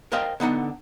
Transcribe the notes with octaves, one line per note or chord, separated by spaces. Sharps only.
A#4 C5 D#5 F5 G5
D3 B3 D#4 F#5